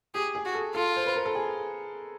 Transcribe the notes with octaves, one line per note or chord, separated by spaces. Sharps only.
G4 G#4
G#4
F#4
A4
F4 A4
C5
B4
A#4
A4
G#4